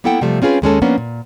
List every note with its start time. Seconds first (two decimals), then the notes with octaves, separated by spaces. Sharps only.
0.04 A#3 B3 E4 A4 F#5 G5
0.21 C3 F3 G3 A3
0.42 C4 C#4 F4 G#4 B4
0.62 D#2 G#3 C#4 A4
0.82 F3 A#3 B3 C#4 D4
0.98 A#2